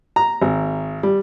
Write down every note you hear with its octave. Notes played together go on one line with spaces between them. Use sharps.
A#5
G#1
G3